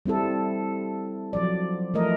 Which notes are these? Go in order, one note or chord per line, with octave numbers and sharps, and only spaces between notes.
G3 C4 E4 A4
F3 F#3 D5
E3 F3 A3 A#4 D#5